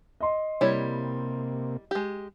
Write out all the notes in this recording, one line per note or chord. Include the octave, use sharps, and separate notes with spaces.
D#5 C6
C3 G3 A#3 E4 C#5
G#3 G4